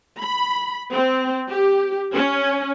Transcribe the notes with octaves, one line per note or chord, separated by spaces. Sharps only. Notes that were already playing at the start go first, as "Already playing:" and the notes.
B5
C4
G4
C#4